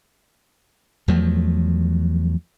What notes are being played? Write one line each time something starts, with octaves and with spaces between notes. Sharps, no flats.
E2 F3 F#3 A3